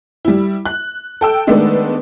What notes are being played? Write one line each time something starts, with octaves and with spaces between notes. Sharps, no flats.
G3 E4
F#6
A4 G5 E6
D#3 G#3 A3 B3 D4